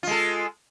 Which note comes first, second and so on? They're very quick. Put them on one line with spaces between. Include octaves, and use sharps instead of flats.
F4 G#3 A4